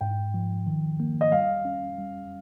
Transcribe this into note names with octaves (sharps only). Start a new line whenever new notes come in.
G#2 G5
F3
D#3
A#3
D#5
G3 F5
C#4
G3